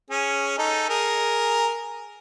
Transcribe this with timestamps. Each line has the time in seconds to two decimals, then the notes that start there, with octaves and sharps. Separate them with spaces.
0.10 C#4 G#4
0.58 D#4 A4
0.89 G#4 A#4